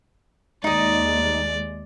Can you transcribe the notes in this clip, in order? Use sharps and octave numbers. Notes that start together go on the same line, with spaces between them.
D#2 G#3 D#4 D5 D#5